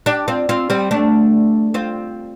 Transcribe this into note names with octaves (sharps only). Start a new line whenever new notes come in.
D4 G4
C4 F4
C4 F4
G3 C4
A3 D4
C4 F4